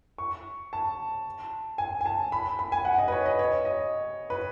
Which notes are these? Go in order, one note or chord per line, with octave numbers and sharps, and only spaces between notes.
C#6
A5
G#5
G#5
A5
B5
B5
G#5
F#5
D#5
B4
C#5
D#5
C#5
D#5
B4